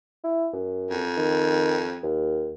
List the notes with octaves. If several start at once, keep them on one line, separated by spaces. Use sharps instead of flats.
E4
F#2
F2
D#3
D#2